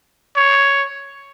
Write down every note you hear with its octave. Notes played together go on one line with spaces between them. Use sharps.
C#5